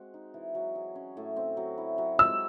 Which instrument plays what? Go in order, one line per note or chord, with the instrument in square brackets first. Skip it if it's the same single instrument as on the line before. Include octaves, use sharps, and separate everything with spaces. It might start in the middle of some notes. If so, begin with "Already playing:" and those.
Already playing: [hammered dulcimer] G#3 C4 F#4
D#4
E3
F#3
G#4
C#4
A2
C4
F#3
E4
F#3
[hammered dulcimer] G#3 [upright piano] E6